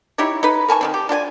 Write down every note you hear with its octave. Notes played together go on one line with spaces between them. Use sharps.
D#4 E4 G4 C#5
D#4 B4
A#4 G#5 A5 C#6
D#3 F3 C4
G4
D4 F4 G5 G#5